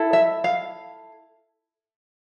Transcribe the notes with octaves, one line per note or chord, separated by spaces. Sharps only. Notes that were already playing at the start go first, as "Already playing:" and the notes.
Already playing: E4 A4
E5
F5